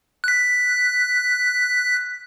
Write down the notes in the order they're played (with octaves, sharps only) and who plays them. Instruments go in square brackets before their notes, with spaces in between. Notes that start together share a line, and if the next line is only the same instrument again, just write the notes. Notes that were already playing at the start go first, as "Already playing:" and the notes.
[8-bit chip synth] F#6 B6